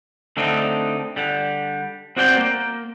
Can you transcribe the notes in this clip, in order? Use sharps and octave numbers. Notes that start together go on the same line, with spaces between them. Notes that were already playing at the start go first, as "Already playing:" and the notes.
D3 A3 C4 D4 D#4
D3 G3
C4 F#4 C5 D5 E5 G5
A#3